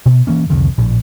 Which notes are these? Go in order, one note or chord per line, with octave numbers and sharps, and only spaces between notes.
B2
E3 A#3 C#4
C2 F2 D3 D#3
A#1 A2